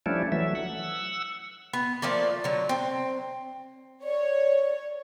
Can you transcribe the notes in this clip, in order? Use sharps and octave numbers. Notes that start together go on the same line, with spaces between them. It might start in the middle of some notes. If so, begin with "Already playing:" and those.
F3 G3 A3 C#4 D4 E4
E3 F#3 A3 E5
F#5 E6
B3
F3 A3 A#3 D5
D3 F#3
C4
C#5 D5